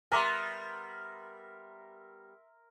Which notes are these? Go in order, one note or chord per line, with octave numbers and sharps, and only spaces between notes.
G3 B3 A#4 E5 G#5 A#5 C6 D6